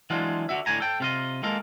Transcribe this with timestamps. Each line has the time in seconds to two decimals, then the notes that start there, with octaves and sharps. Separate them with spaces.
0.10 E3 F#3 G#3 D4 F4
0.49 D3 F#4 E5
0.66 A2 D3 G#5 A#5
0.80 A4 G5
1.00 C3 F4 D#5
1.43 G#3 A#3 F4 A4 A#4